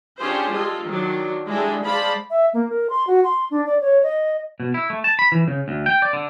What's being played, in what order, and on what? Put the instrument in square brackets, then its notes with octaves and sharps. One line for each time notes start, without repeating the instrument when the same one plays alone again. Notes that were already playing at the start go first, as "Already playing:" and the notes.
[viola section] C#4 D4 F4 G4 G#4 C5
G#3 F4 A4
D#3 F#3 D4
G3 G#3 D4 E4 A4
G#3 C5 D5 F5 A5 B5
[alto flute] E5
A#3
A#4
C6
F#4
C6
D4
D5
C#5
D#5
[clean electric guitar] B2
E4
A3
A5
B5
E3
C#3
D2
G5
D5
D3